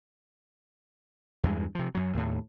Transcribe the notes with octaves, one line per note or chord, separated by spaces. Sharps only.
E2 G2 G#3
C3 F3
F#2 F#3
D#2 A2